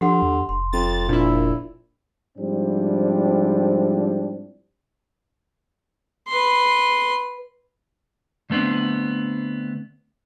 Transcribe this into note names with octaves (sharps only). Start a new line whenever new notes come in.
D3 F3 G4 F#5 C6
E2
F1 C6
F2 A6
A#1 A#2 E4
G#2 F3 G3 C4 D4 E4
B4 C6
D3 A3 B3 C4 D4